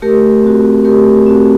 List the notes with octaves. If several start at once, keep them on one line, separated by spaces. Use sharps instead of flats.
A3 G4 A#4
C4 F#4
A3 G4 A#4
C4 F#4